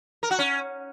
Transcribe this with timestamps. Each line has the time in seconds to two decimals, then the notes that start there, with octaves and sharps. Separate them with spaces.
0.23 A#4
0.31 F#4
0.39 C#4